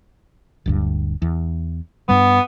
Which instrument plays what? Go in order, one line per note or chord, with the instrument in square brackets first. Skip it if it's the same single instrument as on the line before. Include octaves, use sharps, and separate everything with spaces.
[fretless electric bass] D1 D2 G2
E2
[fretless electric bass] G2 G3 [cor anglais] B3